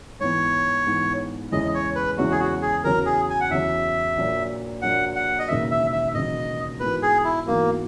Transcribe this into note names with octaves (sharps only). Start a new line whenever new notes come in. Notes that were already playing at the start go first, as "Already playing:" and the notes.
G#2 E3 B3 C#5
G#2 E3 B3
E2 C#3 G#3 C#4 E4 D#5
C#5
B4
E2 C#3 G#3 C#4 E4 F#4
G#4
F#4
G#4
E2 C#3 F#3 A#4
G#4
G#5
F#5
E2 C#3 F#3 E5
A#1 A#2 F#3 A#3
A#1 A#2 F#3 A#3 F#5
F#5
D#5
E1 D#2 C#3 F#3 A#3 E5
E5
E5
E1 D#2 C#3 F#3 A#3 D#5
G#2 E3 B3 F#4 A#4 B4
G#4
E4
G#2 E3 A#3 B3 F#4 A#4